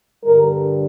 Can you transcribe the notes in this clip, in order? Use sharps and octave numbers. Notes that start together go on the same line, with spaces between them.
G2 D3 G3 A#4